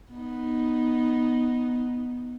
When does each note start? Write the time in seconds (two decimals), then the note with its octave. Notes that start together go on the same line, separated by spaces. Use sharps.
0.12 B3 D#4